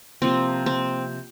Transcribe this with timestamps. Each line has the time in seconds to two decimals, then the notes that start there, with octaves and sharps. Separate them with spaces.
0.22 C3 F3 A#3 C4
0.66 C4